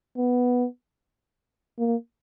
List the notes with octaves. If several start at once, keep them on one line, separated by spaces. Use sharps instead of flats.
B3
A#3